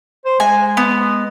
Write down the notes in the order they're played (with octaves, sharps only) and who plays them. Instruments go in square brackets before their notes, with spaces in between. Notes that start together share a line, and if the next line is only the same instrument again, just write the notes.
[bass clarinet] C5
[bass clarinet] G#3 [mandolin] G#5
[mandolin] B3